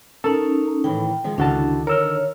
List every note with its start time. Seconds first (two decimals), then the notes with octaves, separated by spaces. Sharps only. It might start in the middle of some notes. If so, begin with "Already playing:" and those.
0.24 C#4 D#4 A4 A#4
0.84 A2 D#3 E3 G5
1.24 D#3 F3 G#3
1.38 C#2 D3 D#3 D4 E4 F#4 A5
1.87 A#4 C#5 E6 F6